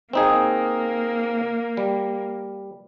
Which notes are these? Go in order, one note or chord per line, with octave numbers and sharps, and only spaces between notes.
A#3 C4 D#4 G#4
G3